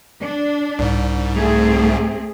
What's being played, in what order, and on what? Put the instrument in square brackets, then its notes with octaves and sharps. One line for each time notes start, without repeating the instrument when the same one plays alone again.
[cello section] D4
[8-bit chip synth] C2 G#2
[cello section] A3 C4 G#4